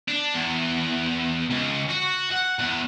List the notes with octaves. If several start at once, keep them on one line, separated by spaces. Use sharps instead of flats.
D4
E2
C#2
F#4
F#5
E2